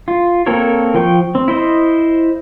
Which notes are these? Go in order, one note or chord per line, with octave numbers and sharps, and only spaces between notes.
F4
A#3 C4 A4 A#4 C#5
F3 G5 C#6
C4
E4 C5 D#5